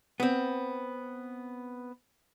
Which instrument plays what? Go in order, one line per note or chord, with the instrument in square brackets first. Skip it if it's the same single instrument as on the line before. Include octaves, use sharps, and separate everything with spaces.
[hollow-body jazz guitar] B3 C4